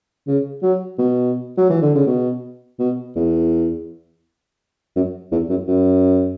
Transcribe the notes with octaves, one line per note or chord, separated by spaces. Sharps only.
C#3
F#3
B2
F#3
E3
D3
C#3
B2
B2
E2
F#2
E2
F#2
F#2